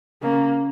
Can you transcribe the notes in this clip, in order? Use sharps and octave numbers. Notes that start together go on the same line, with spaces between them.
C#3 A#3